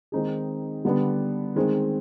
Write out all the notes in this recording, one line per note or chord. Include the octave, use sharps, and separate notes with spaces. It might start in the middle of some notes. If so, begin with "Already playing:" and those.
D#3 G#3 C4 D#4 G#4
D3 G3 B3 D4
D#3 G#3 C4